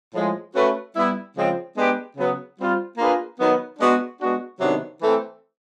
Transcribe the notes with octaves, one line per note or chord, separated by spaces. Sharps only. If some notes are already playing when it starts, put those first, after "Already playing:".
A2 F3 G#3
A3 C#4 F#4 B4
G3 B3 E4
C#3 F3 G#3 C4
G#3 B3 D4 G4 B4
C#3 F#3 B3
G3 C4 F4
A#3 D4 F4 G#4 B4
D#3 F#3 B3
G#3 B3 D4 F#4
G#3 B3 D4 F#4
C3 D#3 F#3 B3 D4
E3 A3 C4